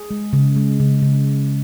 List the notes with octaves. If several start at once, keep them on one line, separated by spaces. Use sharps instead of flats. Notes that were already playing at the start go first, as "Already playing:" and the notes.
Already playing: G#4
G#3
C#3
G#3
C#3
C#3